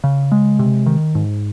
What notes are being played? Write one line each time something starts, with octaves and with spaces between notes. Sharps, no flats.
C#3
G#3
C3
D#3
G#2